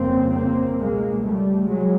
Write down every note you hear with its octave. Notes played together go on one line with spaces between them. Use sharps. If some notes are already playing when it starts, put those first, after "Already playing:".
Already playing: G1 F2 C#3 A#3 C4
A#3 C4
C#2 B2 G#3 A#3
G3 A3
C3 F#3 G#3